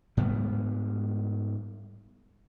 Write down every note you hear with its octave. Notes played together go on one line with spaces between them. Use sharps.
G#2 G3 B3